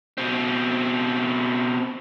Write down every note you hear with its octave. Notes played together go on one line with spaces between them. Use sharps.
B2 C4